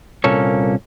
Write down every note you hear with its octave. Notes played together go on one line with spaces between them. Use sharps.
C2 A#2 A#3 C#4 A4 C#5